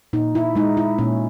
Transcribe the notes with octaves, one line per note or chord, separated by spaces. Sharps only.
A#2 D#4
E4
G#3 D#4
E4
A#2 C#4